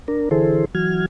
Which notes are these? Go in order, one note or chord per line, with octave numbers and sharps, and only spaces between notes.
D4 A#4
D3 E3 E4 G#4 A4 C5
E3 F#3 F#4 F6 G#6